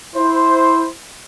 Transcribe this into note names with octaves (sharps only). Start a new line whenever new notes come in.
E4 C5